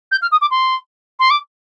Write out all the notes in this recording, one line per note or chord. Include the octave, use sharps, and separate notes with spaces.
G6
F6
D#6
D6
C6
C6
D6